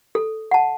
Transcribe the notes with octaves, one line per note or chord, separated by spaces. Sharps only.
A4
F#5 A5